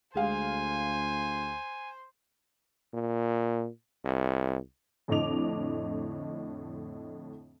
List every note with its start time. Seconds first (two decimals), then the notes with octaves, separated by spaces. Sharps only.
0.15 D2 G#3 C5 F5 G#5
2.94 A#2
4.05 C2
5.08 F2 A2 D3 D#5 D6 F7